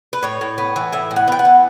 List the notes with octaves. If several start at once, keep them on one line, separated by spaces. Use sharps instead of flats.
B4
A2 C#5
A2
B3
E3
A2 E5
A2
F#5
B3 G5
F#5
E3